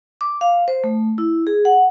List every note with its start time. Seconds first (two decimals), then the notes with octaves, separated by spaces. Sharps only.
0.21 D6
0.41 F5
0.68 C5
0.84 A3
1.18 E4
1.47 G#4
1.65 F#5